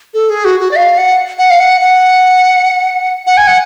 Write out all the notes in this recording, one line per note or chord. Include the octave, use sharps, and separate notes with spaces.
A4
G#4
F#4
F#4
D5
F5
F#5
F#5
F5
F#5
F#5
F#5
G#5
F#5